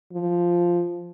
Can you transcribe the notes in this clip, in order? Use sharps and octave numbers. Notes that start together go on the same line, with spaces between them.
F3